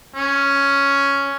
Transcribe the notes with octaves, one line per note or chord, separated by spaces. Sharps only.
C#4